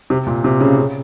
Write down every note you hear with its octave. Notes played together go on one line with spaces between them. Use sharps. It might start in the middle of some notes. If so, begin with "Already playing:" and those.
C3
A#2
C3
C#3
C#3